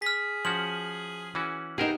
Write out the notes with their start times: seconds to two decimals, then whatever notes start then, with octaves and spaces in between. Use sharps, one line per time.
0.02 G#4 F6 B6
0.45 F3 C#4 F#4 F#7
1.35 E3 C#4 F#4
1.78 B2 E3 D#4 G4 G#4 A#4 C5 F#5